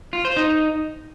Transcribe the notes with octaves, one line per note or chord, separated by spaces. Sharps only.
F4
C5
D#4